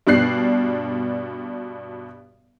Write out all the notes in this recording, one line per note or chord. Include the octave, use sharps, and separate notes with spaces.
G2 B2 D4 F#6 C7